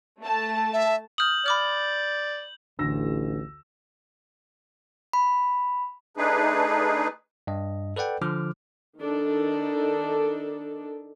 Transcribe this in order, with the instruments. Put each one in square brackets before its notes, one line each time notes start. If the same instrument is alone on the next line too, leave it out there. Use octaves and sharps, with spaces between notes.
[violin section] A3 A5
[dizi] E5
[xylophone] D#6 F6 [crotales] G6 F#7
[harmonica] D5 [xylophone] B5 D6 F6
[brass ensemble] A1 [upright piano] D2 E6 A#6
[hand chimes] B5
[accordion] A3 D4 D#4 G#4 B4
[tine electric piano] G2 D#5
A4 B4 D5 F#5 G5
D3 F3 D6 F6
[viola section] D#3 D4 A4